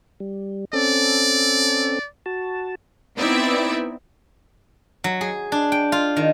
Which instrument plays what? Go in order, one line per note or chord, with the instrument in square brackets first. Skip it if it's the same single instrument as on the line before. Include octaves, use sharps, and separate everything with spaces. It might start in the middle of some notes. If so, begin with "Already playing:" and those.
[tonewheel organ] G3
[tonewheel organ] C4 C#4 A4 [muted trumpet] D5
[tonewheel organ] F#4 A5
[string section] B3 C4 D#4 E4 D5 E5
[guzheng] F#3
G#4
D4
G5
F4
D#3